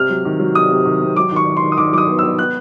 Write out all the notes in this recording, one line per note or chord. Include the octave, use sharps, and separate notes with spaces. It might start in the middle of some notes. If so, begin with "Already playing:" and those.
Already playing: C3 F6
F#3
D#3
F#3
C3 D#6
C3
D#3
C3
F#3 D6
D#3
C#6
D#3
C6
D#3
D#6
D#3 D6
F#3 D6
D#6
B3
B3 E6
B3 F#6